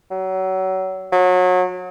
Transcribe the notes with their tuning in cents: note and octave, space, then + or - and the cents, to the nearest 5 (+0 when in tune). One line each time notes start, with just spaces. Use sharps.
F#3 +30
F#3 -30